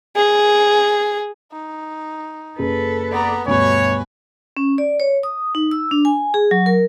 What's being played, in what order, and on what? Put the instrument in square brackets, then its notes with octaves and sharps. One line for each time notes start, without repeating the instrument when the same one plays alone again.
[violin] G#4
[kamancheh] D#4
[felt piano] F#1 G#4 [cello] A4 B4
[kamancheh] B3 A#5 [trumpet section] D5
[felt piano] D2 B2 [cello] G2 [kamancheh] B4 G#5 [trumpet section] C#5
[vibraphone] C#4
D5
C#5
D#6
D#4
E6
D4
G#5
G#4
F#3
A#4